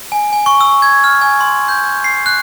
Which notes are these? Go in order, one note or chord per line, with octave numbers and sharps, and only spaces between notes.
G#5
G#5
C#6
E6
G#6
F6
G#5
C6
G6
C7
F#6